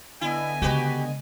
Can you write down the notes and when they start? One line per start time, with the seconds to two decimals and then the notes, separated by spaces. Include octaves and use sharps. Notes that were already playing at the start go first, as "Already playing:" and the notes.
0.21 D3 B3 E4 D#5 G#5
0.62 C#3 G#3 F#4 G4 B4